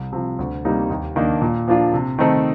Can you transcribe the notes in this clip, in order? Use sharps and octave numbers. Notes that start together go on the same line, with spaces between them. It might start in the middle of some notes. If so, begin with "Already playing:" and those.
Already playing: C2
C3 F3
D2
C3 G3 A#3 D#4
D#2
D#3 A#3 D4
A#2
F3 A#3 D4 F4
C3
D#3 A3 C4 D#4